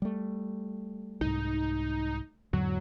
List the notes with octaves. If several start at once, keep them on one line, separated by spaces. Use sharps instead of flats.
G3 A3
C2 G#2 D#4
E2 G#2 D3 F#3